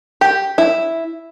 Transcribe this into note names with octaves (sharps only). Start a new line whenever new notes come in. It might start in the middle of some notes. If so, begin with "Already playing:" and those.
G4
E4